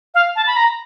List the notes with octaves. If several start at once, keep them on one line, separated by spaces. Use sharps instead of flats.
F5
A5
B5
A#5